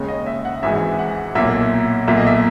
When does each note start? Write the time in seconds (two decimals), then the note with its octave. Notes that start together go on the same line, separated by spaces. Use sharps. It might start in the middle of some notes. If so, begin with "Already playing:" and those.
Already playing: D#2 C#3 G#3
0.08 D#5
0.27 E5
0.45 F#5
0.63 G#1 G#2 E3 G#3 E5
0.99 F#5
1.35 B1 A#2 A#3 E5
2.08 B1 A#2 A#3 E5
2.17 D#5
2.27 E5